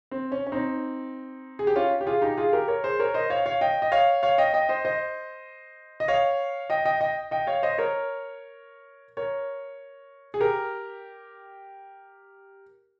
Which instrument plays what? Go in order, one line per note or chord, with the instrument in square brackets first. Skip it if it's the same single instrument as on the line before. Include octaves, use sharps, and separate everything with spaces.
[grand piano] C4
C#4
C#4
C4 D#4
G#4
G4
C#4 F4
G4
F4 G#4
D#4 G4
F4 G#4
G4 A#4
A#4 C#5
G#4 C5
A#4 C#5
C5 D#5
C#5 F5
C#5 F5
D#5 G5
D#5
C#5 F5
C#5 F5
D#5 G5
D#5 G5
C5 D#5
C5 D#5
D#5
C#5 F5
D#5 G5
D#5 G5
D#5 G5
D#5 G5
C#5 F5
C5 D#5
A#4 C#5
A#4 C#5
G#4
G4 A#4